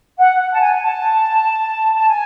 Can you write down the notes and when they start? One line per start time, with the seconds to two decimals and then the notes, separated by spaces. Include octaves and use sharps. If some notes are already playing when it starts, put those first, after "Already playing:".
0.18 F#5
0.39 F#5
0.51 A5
0.61 G#5
0.74 G#5
0.82 A5
1.96 A5
2.09 G#5